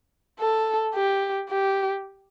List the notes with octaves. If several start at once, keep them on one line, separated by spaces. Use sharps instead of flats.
A4
G4
G4